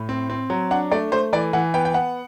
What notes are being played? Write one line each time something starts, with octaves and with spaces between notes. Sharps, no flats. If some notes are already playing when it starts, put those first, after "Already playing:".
Already playing: A2
C4
C4
F#3
D4 F#5
A3 D5
A3 C5
E3 D5
E3 F#5
B3 G5
G5
B3 F#5